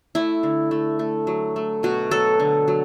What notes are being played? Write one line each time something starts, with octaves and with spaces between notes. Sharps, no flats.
A3 E4
D3
A3
A3
F#3
A3
B2 F#4
F#3 A4
D3
F#3